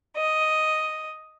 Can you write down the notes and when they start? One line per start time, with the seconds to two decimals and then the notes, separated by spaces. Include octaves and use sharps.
0.18 D#5